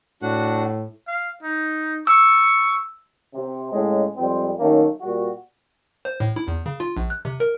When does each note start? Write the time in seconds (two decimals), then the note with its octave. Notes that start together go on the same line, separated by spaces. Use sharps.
0.22 A2 D4 F#4 F#5
1.07 F5
1.43 D#4
2.07 C#6 E6
3.35 C3
3.72 A2 C#3 G#3
4.17 F2 G3 G#3 C4
4.59 D#3 F#3 A3 A#3 C#4
5.01 A#2 G3 F#4
6.05 C5
6.20 A2
6.36 E4
6.48 E2
6.66 C#3
6.80 F4
6.96 A#1
7.10 F#6
7.25 C3
7.40 A#4